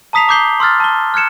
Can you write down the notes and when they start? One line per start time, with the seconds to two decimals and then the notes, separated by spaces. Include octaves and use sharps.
0.13 A5 A#5 D#6 B6 C7 F7
0.28 A#5 D6 D#6 G6 C7 G7
0.60 C6 E6 F6 A6
0.80 A5 G7
1.14 F6 F#6 G#6 C#7 E7